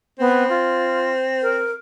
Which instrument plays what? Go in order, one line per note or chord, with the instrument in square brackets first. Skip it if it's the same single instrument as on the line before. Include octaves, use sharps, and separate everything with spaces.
[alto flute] B3 [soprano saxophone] C4
[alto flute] F4
A#4